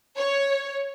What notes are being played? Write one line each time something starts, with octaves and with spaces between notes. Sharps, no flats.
C#5